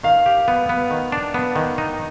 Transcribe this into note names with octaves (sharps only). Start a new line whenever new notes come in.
D#3 F5
G4
B3
B3
D#3
D4
B3
D#3
D#4